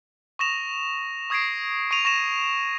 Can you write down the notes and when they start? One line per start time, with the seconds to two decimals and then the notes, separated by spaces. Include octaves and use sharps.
0.39 C#6 D#6 A#6 E7 F7
1.30 C#6 D#6 G#6 A#6 C7 D7
1.91 C#6 A#6 D7 D#7 F7
2.05 C#6 A#6 E7 F7